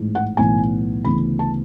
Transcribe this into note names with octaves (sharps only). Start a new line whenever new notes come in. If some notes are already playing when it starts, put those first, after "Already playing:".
Already playing: A1 G#2 G#3
F#5
B1 A2 E3 B3 G#5
D2 C#3 E3 B3 B5
A5